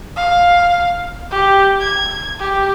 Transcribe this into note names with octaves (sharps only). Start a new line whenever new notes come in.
F5
G4
G#6
G4